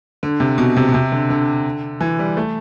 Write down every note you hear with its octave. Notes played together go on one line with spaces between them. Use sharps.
D3
C3
B2
C3
B2
C3
D3
D3
E3
G3
A3